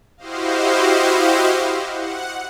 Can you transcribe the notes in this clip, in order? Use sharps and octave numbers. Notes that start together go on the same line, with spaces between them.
E4 F#4 G4 C5 D#5 F5
F#5